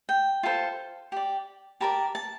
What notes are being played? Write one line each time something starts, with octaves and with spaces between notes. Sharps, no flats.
G5
F4 A4 C5
G4 D5
G4 A#4 D5 A5
A5